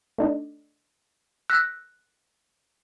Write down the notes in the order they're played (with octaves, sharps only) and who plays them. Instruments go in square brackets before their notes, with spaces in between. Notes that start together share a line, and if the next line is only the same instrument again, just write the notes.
[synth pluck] A3 D4 D#4
[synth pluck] E6 A#6 B6 [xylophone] F#6